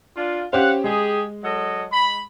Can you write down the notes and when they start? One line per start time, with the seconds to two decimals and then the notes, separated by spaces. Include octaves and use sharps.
0.16 D4 F4
0.53 C#4 G4 C5 F5 F#5
0.84 G#3 G4 G#4
1.44 F#3 A4 D#5
1.92 B5